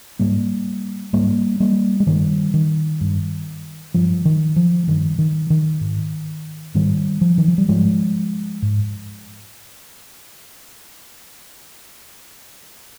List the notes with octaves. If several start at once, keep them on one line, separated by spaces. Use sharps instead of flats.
G#2 G3 A#3
G#2 G3 A#3
G3 A#3
G#3
G2 D#3 G3
D#3
G2
G2 F3
D#3
F3
G2 D#3
D#3
D#3
G#2
G#2 D#3 G3
F3
D#3
F3
G3
G#2 F3 G#3
G#2